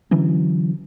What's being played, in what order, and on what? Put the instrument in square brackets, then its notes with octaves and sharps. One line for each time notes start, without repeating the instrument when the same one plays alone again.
[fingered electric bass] D3 E3 F#3 C#4